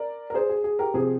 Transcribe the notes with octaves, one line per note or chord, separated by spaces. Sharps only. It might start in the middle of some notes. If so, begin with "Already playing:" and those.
Already playing: A#4 D5
A#4
G#4 C5
G#4
G#4
G4 A#4
C3 F3 C4 G#4